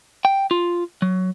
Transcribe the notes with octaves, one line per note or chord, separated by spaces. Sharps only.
G5
F4
F#3